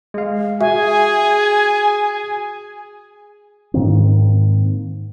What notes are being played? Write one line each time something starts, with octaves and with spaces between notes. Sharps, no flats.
G#3 F5
F#4 G#4 E5 G#5
G#2 D#3 A#3 C4